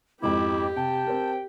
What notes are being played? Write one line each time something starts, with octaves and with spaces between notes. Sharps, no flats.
F2 G#2 E4 G4 D6
C3 G5 A5
C4 A#4